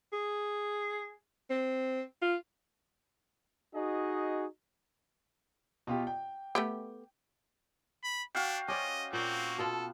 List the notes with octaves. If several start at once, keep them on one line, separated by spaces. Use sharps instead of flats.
G#4
C4
F4
D#4 F#4 G#4 D#5
B2 F4 G4
G5
A3 B3 G4
B5
D4 F#4 F5 G5
C#4 C5 D5 D#5 D6
A#2 A#3 C4 F#4 G5
B2 B3 F4 A4